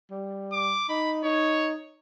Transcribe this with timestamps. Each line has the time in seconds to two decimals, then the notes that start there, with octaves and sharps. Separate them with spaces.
0.11 G3
0.52 D6
0.89 D#4 B5
1.24 D#4 C#5